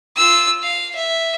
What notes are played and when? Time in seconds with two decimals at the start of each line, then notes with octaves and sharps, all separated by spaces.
0.16 F4 E6
0.63 F5
0.96 E5